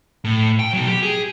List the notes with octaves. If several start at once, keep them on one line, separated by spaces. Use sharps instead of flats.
A2
G5
B2 F#3
G4
G#4